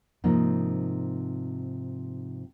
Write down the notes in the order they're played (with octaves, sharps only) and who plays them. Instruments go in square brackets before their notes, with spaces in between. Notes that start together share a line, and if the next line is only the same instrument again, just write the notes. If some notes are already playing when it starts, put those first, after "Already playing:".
[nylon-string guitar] G#2 C3 F3 A#3 D#4